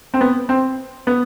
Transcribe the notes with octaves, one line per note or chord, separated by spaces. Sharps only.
C4
B3
C4
B3